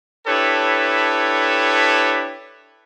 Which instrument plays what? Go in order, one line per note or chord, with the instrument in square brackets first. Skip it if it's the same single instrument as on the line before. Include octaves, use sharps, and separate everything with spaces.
[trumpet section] D4 E4 G4 A4 B4 C#5